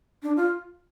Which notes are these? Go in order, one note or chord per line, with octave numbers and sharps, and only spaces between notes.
D4
F4